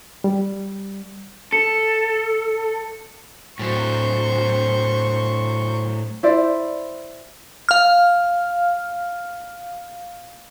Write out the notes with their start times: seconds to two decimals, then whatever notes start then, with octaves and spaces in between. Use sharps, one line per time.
0.24 G3
1.52 A4 C#7
3.59 A2 F#3 C5 C#6
6.23 E4 C5 D5
7.69 F5 F6